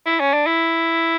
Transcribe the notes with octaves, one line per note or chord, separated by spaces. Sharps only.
E4
C#4
D4
E4